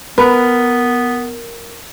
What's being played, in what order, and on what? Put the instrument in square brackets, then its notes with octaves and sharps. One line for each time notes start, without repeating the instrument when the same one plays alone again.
[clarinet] B3 [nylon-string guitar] A#4 [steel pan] B4